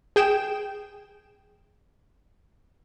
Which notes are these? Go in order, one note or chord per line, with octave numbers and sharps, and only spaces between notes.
G#4 G5 E7